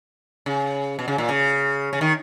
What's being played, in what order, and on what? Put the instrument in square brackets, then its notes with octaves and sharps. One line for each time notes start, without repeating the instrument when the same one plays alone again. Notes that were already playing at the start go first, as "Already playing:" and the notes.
[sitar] C#3
B2
C#3
A#2
C#3
C#3
D#3